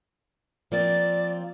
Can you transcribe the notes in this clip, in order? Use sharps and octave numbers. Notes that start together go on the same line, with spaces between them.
F3 A#3 C4 D5